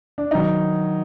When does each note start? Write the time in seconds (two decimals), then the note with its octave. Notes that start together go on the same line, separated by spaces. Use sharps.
0.18 D4
0.31 D#3 F#3 D#4